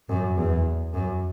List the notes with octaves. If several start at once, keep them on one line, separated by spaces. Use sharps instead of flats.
F#2
E2
F#2